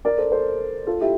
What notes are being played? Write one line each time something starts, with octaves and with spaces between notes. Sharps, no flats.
A#4 D5
A4 C5
A4 C5
F4 A4
E4 G4